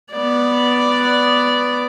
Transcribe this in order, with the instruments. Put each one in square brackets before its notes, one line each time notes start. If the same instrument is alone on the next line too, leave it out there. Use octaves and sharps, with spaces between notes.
[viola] B3 D5